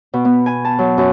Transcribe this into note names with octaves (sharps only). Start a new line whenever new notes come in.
B2
B3
G#5
A5
F#3
F#2